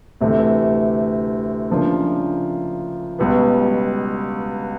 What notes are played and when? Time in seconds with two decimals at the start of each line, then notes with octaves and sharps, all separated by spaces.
0.21 D2 C3 E3 A3
1.70 C#3 F3 A#3 D4
3.18 C#2 B2 G3 B3